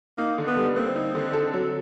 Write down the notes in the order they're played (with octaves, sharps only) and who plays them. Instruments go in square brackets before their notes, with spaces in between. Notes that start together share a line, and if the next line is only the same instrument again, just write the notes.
[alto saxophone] A#3 [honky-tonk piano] D#4
[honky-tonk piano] D3
[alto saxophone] B3
[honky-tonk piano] G3
[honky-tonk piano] A#3 [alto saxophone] C4
[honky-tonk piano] D#4
D3
A4
F#3